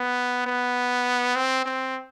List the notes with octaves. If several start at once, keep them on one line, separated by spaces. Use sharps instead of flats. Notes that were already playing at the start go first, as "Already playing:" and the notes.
Already playing: B3
B3
C4
C4